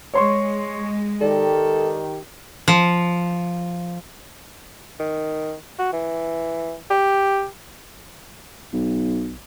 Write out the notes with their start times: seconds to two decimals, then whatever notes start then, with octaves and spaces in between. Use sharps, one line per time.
0.14 G#3 C#5 C6 C#6
1.21 D#3 G4 A4 D5
2.68 F3
5.00 D#3
5.79 F#4
5.93 E3
6.91 G4
8.73 B1